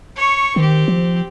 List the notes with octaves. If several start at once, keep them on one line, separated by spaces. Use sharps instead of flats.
C#5 C#6
D#3 C4 G4
F3